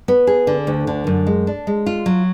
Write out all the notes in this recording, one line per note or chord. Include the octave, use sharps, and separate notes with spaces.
B3
G#4
D3
D2
D3
F#2
G#3
D4
G#3
F4
F#3